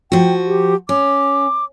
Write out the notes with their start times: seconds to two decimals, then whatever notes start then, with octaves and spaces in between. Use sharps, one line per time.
0.12 F3 F#4 G5
0.46 G4
0.89 C#4 D6